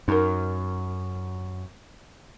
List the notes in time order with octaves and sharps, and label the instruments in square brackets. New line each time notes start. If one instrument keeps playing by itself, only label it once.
[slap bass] F#2 [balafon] D#4 A#4